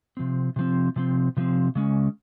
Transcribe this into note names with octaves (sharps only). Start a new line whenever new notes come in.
C3 F3 C4
C3 F3 C4
C3 F3 C4
C3 F3 C4
C#3 G#3 C#4